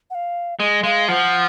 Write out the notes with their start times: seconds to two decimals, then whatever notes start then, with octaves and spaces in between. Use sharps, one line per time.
0.10 F#5
0.15 F5
0.59 G#3 D#5
0.84 G#3 F5
1.08 F3 F#5